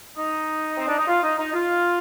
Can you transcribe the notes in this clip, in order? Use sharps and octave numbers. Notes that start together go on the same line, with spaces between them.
D#4
C4
D4
D#4
F4
D#4
D#4
F4